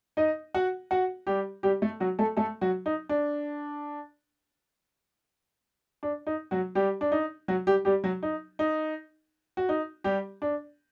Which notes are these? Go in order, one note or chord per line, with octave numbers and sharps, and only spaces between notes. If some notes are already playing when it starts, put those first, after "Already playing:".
D#4 D#5
F#4 F#5
F#4 F#5
G3 G4
G3 G4
A3 A4
F#3 F#4
A3 A4
A3 A4
F#3 F#4
D#4
D4
D4
D#4
F#3 F#4
G3 G4
D4
D#4
F#3 F#4
G3 G4
G3 G4
F#3 F#4
D#4
D#4
F#4
D#4
G3 G4
D4